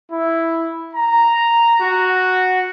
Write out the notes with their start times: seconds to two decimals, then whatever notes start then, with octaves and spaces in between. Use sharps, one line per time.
0.12 E4
0.95 A#5
1.81 F#4